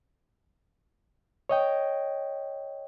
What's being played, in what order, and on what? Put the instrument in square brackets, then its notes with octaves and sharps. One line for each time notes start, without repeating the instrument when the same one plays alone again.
[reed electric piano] C#5 D#5 G5